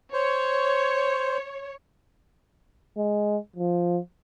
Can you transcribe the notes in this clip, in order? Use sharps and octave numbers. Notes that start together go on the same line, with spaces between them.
C5 C#5
G#3
F3